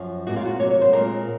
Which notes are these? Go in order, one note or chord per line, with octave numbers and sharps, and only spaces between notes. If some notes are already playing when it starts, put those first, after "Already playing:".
Already playing: F#2 F3
A#2 G#3 C4 F#4
F4
F#4
C3 F#3 A#3 C#5
C#5
C5
A#2 G#3 C4 A#4